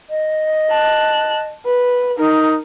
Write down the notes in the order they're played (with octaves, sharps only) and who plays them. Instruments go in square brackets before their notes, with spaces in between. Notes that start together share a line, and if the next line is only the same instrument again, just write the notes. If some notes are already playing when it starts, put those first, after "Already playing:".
[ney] D#5
[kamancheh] A5 F#6
B4
[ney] D#4 [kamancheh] A#4